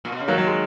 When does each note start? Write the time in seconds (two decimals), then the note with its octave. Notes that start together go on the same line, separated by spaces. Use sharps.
0.05 A#2
0.12 B2
0.20 C#3
0.28 D#3 F#3 A#3
0.38 F#3
0.47 G#3